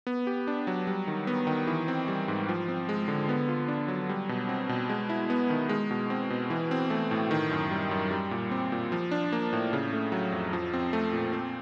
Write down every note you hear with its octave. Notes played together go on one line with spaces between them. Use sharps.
B3
G4
D4
F#3
G3
D#3
B3
D#3
E3
C4
G3
G#2
F3
C4
G#3
D3
B3
F4
D4
F#3
G3
B2
C4
B2
G#3
E4
B3
D#3
G#3
B2
C4
B2
E3
C4
A3
A2
D#3
F#2
G3
F#2
G3
A#2
C4
A#2
F3
D4
A#3
A2
C#3
A3
F#3
F2
F3
C4
A3
A#2
C4